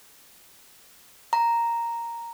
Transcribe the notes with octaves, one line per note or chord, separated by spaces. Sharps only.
A#5